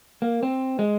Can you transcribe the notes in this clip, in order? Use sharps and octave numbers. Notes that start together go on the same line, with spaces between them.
A#3
C4
G#3